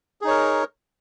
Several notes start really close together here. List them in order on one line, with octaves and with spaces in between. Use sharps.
G#4 D#4 C#5 A#4